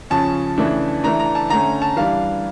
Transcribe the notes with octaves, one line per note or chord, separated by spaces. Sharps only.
C#3 F3 C#4 A5
C#3 E3 A3 D4
E3 A3 D4 A#5
A#5
A5
D3 A3 C#4 A#5
A5
E3 G3 D4 F5